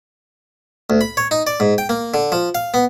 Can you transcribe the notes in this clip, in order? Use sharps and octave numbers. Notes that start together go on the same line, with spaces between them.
D2
B5
C#5
D#4
D5
G#2
G5
A#3
D3
F3
F5
B3